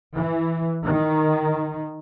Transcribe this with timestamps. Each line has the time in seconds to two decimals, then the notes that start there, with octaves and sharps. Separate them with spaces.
0.14 E3
0.84 D#3